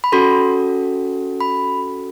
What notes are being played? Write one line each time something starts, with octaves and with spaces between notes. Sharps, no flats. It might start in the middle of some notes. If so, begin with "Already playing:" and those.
B5
C#4 F#4 A4 C6
B5